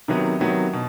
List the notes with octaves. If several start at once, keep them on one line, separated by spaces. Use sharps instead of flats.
C3 D#3 F#3 B3
C3 D#3 F#3 B3
B2